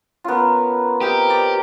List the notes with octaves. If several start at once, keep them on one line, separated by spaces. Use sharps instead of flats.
B3 C#4 F4 A#4
C4 G4 A#4 D#5 G5
D5 A#5